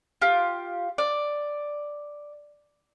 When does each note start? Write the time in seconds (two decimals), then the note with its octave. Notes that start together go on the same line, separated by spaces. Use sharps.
0.21 F4 G4
0.98 D5